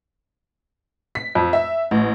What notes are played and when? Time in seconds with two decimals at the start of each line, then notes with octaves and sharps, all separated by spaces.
1.15 B6
1.35 F2
1.53 E5
1.91 A1